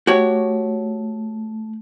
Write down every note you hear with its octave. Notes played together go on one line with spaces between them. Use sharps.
A3 F#4 G4 C#5